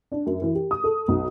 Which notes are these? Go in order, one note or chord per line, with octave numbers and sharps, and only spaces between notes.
D4
F#2
E3
G4
D#6
A4
B1